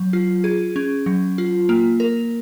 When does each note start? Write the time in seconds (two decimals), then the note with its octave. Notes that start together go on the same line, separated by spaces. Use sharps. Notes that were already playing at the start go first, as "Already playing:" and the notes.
Already playing: F#3
0.13 F4
0.44 G#4
0.76 C#4
1.06 F#3
1.38 F4
1.69 A#3
2.00 A#4